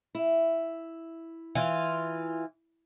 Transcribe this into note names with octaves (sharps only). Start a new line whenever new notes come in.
E4
E3 F4